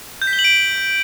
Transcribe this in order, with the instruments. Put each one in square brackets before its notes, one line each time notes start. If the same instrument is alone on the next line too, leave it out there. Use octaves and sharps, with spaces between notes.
[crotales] G6
B6
G7
F#7
D7